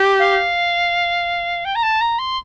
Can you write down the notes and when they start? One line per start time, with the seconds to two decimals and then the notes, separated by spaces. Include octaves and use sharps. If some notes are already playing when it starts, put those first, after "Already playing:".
Already playing: G4
0.19 F5
1.65 G5
1.75 A#5
1.83 A5
2.01 A#5
2.19 C6